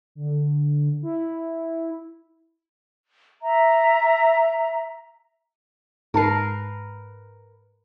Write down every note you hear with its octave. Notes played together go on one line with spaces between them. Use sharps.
D3
E4
E5 A#5
G#2 A#4 B4 A5 C7